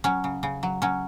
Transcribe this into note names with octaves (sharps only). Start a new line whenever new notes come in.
F#3 C#4
C#3
C#3
F#3
F#3 C#4